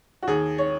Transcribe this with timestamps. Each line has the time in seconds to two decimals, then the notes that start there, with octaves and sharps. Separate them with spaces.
0.22 F#4
0.27 D#2 G#4
0.58 C#5